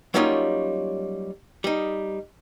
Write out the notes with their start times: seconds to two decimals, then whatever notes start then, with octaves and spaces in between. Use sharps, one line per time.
0.14 F#3 G3 A#3 C#4 D#4 F4
1.64 G3 D#4